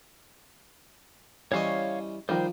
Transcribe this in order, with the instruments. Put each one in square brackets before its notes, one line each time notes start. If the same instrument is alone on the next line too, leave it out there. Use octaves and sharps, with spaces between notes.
[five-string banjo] E3 G3 [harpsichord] C#4 C5 D#5 [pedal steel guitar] C#5 F5 C#6
[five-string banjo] D#3 G3 [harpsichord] F3 [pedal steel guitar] C5